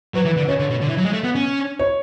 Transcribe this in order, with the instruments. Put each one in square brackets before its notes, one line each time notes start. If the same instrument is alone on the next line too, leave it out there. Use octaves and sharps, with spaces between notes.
[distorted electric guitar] F#3 [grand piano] B4
[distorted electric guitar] E3
D3
[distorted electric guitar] C#3 [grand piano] C#5
[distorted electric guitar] D3
B2
D3
E3
F#3
G#3
A3
B3
C#4
[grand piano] C#5